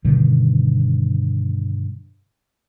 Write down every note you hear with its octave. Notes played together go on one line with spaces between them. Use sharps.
G2 B2 D3 D#3